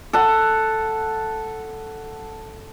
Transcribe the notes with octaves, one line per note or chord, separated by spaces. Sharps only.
A4 F#5